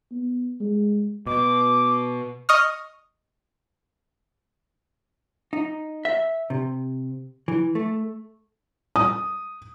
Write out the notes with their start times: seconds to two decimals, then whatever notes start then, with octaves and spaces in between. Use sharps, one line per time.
0.11 B3
0.61 G#3
1.27 B2 D6
2.49 D#5 C#6 D#6 F6
5.53 D#4
6.05 E5
6.50 C3
7.48 E3
7.75 A3
8.96 D#6